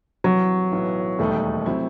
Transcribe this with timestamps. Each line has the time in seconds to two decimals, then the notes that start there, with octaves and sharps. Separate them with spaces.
0.24 C2 C3 E3 F#3
0.72 B1 A2 E3 B3
1.19 E1 D#2 D#3 G3 A3 D#4
1.66 C3 F#3 C4 E4